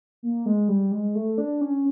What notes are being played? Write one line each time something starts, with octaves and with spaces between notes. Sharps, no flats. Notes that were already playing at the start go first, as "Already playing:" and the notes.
A#3
G#3
G3
G#3
A3
D4
C#4